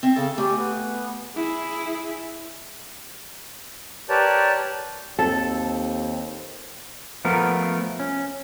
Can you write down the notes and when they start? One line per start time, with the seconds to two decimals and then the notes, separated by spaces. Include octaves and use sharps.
0.03 C4 E5
0.16 C#3 A4
0.38 A3 G4 G#5
0.58 B3
1.36 E4 G#4
4.09 G4 A#4 B4 C#5 D5 A5
5.19 D#2 C4 A4
7.25 F3 A3 B3 A#4
8.00 C#4